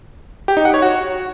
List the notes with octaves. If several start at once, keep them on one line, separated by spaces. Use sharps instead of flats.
G4
D#4
F#5
C#5
F#4